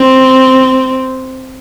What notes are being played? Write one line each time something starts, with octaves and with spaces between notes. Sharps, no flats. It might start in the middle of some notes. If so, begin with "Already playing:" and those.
Already playing: C4